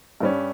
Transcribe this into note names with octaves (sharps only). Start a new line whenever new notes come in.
G2 G3 C#4